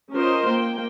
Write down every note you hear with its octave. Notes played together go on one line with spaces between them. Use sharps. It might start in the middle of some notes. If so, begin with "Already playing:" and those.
C#4 F4 A#4 C5 D#5
A#3 G5